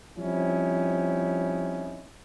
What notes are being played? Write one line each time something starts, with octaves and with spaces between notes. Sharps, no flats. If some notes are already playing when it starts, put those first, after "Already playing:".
F3 G3 C4 C#4 D#4 E4